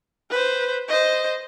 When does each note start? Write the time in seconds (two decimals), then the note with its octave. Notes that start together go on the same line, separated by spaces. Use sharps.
0.31 B4 C5
0.88 C5 D#5